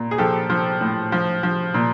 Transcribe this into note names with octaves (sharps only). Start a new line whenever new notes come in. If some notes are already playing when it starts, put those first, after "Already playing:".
Already playing: A#2
G#4
F3 G4 A4
F3
A2
F3
F3
A#2